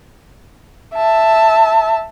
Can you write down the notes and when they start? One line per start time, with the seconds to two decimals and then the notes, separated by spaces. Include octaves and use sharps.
0.95 E5 A5